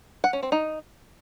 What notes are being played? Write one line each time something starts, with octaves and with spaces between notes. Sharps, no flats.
F#5
C#4
C4
D#4